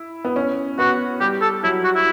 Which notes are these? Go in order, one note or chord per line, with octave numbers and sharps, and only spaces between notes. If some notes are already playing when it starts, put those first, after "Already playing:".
Already playing: E4
B3
C#4
B3 F#4
G3 G4
A4
F#3 E4
F#4
E4